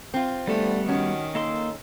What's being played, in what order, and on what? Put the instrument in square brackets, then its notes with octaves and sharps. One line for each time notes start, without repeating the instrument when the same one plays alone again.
[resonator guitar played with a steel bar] C4 F4
[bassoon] D3 [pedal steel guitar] G3 B3 [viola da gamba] A3
[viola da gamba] D#3 [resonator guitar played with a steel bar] C#4 [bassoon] F#4
[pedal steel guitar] A#3 A4 C6 [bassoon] D#4